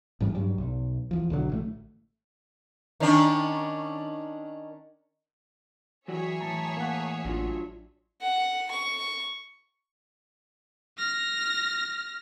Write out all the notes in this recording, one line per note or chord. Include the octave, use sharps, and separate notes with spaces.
A1 G#2 G3
G2 F#3 G3
B1
E2 F3
B1 D3 E3 F#3
A1 G2 A3
D#3 C#4 D4
E3 F#3 F#4 G#4 C#5 D5 E5
A2 E3 A5 A#5
A#3 F#5
A1 F#3 D4 F4
F#5
C#6
F6 A#6